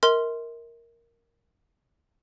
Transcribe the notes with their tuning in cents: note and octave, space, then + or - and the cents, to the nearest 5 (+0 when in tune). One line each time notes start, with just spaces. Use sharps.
A#4 +0 E5 -45 C6 +0